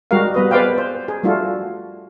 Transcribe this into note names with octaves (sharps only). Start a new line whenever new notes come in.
G3 G#3 F#4 G4 A#4 F5
G3 B3 B4 D#5
G#4 B4 C5 D5 F5 G5
C5
G#4
G3 A3 D4 F4 F#4 A4